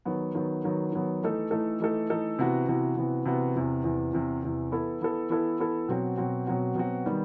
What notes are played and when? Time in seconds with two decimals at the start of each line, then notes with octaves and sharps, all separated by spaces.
0.05 D#3 F#3 B3
0.35 D#3 F#3 B3
0.64 D#3 F#3 B3
0.92 D#3 F#3 B3
1.22 E3 A3 D#4 A4
1.51 E3 A3 D#4 A4
1.80 E3 A3 D#4 A4
2.10 E3 A3 D#4 A4
2.39 C3 E3 B3 F#4
2.68 C3 E3 B3 F#4
2.97 C3 E3 B3 F#4
3.25 C3 E3 B3 F#4
3.55 E2 C3 E3
3.84 E2 C3 E3
4.13 E2 C3 E3
4.43 E2 C3 E3
4.72 E3 B3 E4 A4
5.00 E3 B3 E4 A4
5.29 E3 B3 E4 A4
5.59 E3 B3 E4 A4
5.88 B2 F#3 C4 F#4
6.17 B2 F#3 C4 F#4
6.47 B2 F#3 C4 F#4
6.75 B2 F#3 C4 F#4
7.06 D#3 G3 B3